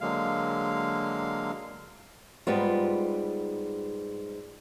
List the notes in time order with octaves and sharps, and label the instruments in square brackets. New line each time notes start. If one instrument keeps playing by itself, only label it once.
[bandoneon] D3 F#3 G#3 A#3 F5
[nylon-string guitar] G#2 G3 B3 F4